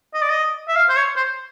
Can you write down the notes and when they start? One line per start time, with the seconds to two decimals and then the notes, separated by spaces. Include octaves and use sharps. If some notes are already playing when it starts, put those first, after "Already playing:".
0.14 D#5
0.22 D5
0.29 D#5
0.68 E5
0.76 F5
0.89 C5
0.96 C#5
1.16 C5